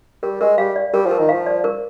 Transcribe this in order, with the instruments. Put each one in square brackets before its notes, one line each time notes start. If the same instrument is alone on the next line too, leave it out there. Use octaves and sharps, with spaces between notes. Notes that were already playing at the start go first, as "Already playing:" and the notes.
[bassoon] G3 [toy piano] A#4
[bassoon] G#3 [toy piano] A#4
[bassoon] G3 [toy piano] F5
[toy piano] D5
[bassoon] G3 [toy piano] A#4
[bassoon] F3
[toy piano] A#4
[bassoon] D#3
[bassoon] F3 [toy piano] F5
[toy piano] D5
A#4